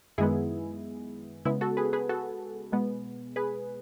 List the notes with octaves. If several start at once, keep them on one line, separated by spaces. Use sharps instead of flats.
F#2 D#3 G#3 B3 E4 G#4
C#3 G#3 B3 E4
F#4 A4
G#4 B4
G#4 B4
F#4 A4
B2 G#3 B3
G#4 B4